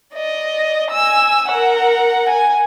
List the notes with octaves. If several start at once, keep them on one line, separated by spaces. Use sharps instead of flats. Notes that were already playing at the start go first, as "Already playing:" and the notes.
D5 D#5
G#5 E6
A#4 F#5
G#5